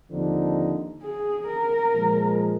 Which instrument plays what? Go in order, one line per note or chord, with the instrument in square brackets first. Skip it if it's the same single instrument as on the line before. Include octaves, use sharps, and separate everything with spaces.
[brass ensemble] D#2 D3 F3 C4 D#4
[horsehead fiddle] G#4
A#4
[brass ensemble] A#2 F3 G#3